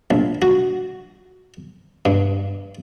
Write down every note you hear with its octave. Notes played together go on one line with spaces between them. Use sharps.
A#1
F#4
G2